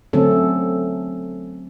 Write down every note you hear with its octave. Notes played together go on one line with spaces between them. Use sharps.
D3 F#3 A3 C4 C#4 A4